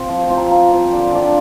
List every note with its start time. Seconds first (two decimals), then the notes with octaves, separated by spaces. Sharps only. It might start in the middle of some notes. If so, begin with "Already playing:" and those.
Already playing: C4 F4 C5
0.09 F3 F5
0.23 G5
0.30 C4 F4
0.37 A#5
0.51 F3 A#5
0.71 C4 F4 G5
0.92 D3 D5
1.13 F3 D4 F4